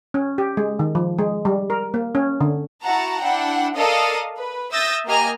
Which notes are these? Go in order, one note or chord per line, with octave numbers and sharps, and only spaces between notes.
C#4
G4
G#3
D#3
F3
G#3
G3
A#4
A#3
C#4
D3
E4 F#4 F#5 A5 A#5
D4 E4 F#5 G5
A4 A#4 D5 D#5 F5 D#6
B4
E5 D#6 E6 G6 A6 A#6
A#3 G4 D#5 G#5 A#5 F6